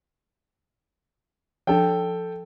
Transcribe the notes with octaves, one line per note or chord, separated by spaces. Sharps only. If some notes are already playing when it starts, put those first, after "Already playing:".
F3 D4 A4 G5